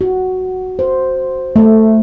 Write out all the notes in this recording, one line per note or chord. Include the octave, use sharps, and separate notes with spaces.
F#4
C5
A3